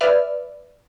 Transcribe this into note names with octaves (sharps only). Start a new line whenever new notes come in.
B4 D5 E5 F6